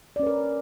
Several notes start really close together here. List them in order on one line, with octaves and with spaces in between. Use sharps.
D5 C#4 B4 A#4